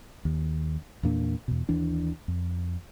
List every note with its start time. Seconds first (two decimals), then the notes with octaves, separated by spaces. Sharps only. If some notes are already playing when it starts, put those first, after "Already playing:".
0.25 D#2
1.03 E2 A#2 A#3 D4
1.48 E2 B2
1.69 D#2 E3 D4
2.28 F2